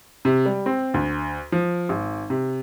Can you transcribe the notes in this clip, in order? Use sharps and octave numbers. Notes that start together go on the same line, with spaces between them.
C3
G3
C4
D2
F3
G#1
C3